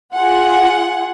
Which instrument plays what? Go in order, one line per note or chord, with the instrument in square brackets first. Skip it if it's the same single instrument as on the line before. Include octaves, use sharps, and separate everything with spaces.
[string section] F4 G#4 F#5